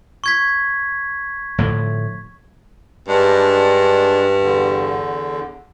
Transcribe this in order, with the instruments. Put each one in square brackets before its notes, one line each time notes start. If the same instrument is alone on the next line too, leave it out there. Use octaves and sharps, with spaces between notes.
[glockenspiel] C#6 G#6 B6
[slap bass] A2 D3 F3
[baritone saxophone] G2 [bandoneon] G#3 D4
[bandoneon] E2 D3